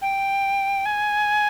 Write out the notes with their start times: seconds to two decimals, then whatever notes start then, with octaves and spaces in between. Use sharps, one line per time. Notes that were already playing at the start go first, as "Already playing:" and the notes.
0.02 G5
0.86 G#5